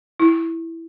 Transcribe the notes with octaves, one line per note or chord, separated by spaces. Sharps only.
E4